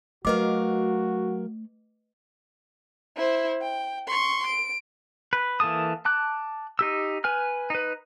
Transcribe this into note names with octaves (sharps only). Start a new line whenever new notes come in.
F#3 A3 F#4 A#4 B4 D#5 F5 D6
E4 C5
G5
C6 C#6
D7
B4
E3 A#3 A4 A5 D#6
A5 D6 F#6
D#4 G4 E6
B4 G#5 F6
D#4 B4